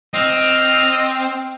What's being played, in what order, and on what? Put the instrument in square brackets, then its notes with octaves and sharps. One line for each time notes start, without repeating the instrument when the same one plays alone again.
[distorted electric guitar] C4 [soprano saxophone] D#5 [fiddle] F6